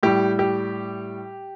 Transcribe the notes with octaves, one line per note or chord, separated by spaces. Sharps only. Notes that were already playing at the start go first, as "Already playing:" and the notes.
A2 G3 G4
G4